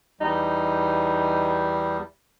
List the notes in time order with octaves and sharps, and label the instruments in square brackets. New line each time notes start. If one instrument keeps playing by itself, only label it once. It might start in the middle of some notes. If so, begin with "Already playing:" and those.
[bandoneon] E2 G3 [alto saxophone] D#4